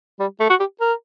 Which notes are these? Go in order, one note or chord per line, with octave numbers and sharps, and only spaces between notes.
G3
A3
F#4
G4
A#4